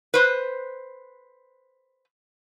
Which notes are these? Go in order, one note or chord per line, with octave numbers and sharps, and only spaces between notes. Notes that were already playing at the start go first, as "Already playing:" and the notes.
B4 C5